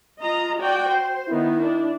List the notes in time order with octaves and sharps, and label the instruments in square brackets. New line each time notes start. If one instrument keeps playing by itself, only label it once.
[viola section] F4 D#5 A#5
F#4 D5 G5
C5
[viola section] D#3 B3 [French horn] E4
[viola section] D4